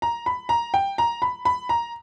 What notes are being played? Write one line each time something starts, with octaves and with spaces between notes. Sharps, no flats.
A#5
B5
A#5
G5
A#5
B5
B5
A#5